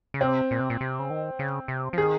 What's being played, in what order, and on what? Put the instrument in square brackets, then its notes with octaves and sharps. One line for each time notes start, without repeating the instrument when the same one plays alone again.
[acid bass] C#3
[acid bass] C3 [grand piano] C4
[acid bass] A#2
C3
A#2
C3
C#3
D#3
C#3
C3
F3
[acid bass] D#3 [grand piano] G#4